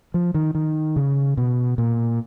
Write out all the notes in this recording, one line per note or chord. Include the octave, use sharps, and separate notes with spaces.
F3
D#3
D#3
C#3
B2
A#2